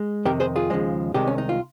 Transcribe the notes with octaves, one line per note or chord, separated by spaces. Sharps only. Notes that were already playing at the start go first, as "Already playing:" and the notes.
Already playing: G#3
F2 C3 D#3 G4 A#4
G#4 C5
F4 G#4
D#2 C#3 F3 G#3
C2 C3 D#3 G#3 D#4 G4
C#4
D#4
F4